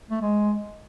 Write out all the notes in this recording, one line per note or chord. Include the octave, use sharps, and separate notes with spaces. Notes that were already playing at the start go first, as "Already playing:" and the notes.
A3
G#3